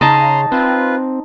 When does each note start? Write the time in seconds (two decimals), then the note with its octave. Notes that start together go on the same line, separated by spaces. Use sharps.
0.01 C#3 D#4 A5 A#5 C6
0.52 C4 F4 B4